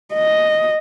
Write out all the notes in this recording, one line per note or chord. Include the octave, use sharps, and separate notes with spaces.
D#5